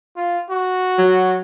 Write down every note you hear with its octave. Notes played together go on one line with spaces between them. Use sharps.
F4
F#4
F#3